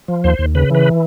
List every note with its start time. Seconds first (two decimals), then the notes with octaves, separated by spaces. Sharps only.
0.08 F3
0.24 D#2 C5
0.39 D#2
0.55 C#3 B4
0.70 E3 B4